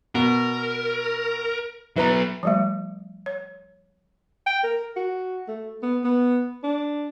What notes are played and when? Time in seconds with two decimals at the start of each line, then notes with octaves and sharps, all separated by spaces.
0.15 B2 A#4
1.96 F#3 B3 E4 B4 A#5
2.43 F3 G3 A3
3.26 C#5
4.47 G5
4.64 A#4
4.96 F#4
5.48 A3
5.83 B3
6.04 B3
6.64 D4